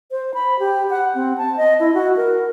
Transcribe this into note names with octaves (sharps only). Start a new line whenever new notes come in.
C5
B5
G4
F#5
C4
A5
D#5
E4
F#4
A#4